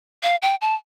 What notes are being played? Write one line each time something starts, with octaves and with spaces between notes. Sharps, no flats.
F5
G5
A5